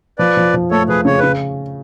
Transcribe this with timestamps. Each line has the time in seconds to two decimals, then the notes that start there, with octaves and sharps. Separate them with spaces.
0.19 F3 B4 D5
0.37 F3
0.54 F3
0.71 A3 A4 C#5
0.88 F3 G#4 B4
1.05 C#3 C#5
1.19 C#3 B4